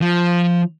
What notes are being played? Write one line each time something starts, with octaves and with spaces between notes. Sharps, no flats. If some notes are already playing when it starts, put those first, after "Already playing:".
F3